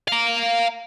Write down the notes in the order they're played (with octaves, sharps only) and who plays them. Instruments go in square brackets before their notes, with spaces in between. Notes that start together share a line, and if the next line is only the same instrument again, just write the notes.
[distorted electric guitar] F5 A#5